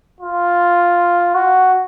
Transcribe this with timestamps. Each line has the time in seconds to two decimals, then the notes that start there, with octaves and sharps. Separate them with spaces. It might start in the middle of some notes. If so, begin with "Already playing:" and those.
0.20 F4
1.35 F#4